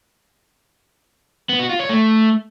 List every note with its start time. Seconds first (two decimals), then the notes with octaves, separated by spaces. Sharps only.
1.49 B3
1.59 F#4
1.69 F4
1.79 C#5
1.89 A3